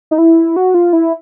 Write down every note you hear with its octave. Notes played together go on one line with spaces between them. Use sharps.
D#4
E4
F#4
F4
E4